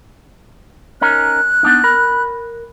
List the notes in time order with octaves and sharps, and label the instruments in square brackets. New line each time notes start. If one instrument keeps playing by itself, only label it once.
[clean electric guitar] C#4 D#4 A#4 [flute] F#6
[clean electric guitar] B3 D4 D#4
A#4 B5